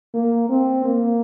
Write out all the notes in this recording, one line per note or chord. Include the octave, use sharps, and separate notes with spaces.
A#3
C4
A#3